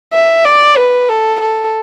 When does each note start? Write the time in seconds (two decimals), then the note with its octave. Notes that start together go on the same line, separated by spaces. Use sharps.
0.13 E5
0.45 D5
0.77 B4
1.09 A4
1.41 A4